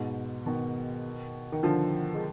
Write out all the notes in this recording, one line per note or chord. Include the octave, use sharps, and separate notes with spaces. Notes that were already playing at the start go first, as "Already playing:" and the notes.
Already playing: G#2 B2
B2 D#3
D#3
D3 F3
G#3